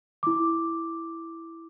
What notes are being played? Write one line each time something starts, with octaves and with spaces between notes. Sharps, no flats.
E4 D6